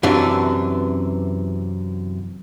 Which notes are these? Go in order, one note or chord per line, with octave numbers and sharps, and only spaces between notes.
F#2 C3 E3 D4